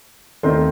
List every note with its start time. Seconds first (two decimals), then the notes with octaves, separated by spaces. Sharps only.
0.43 D#2 D#3 A3 C4 D#4 C6